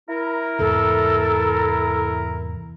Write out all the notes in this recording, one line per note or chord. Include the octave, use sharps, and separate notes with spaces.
E4 A#4
E2 G#2 C3 A4